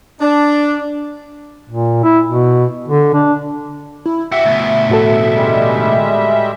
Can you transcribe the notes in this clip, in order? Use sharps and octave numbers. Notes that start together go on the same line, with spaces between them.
D4
A#2
E4
B2
D3
D4
E4
F#4 G4 E5
D2 B2
A2 F#4 A4
G3 G#3